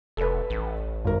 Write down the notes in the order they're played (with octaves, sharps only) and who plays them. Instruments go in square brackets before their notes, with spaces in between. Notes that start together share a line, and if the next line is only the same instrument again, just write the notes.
[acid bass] F1 [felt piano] A4 B4
[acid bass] A1
[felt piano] G#1 A#4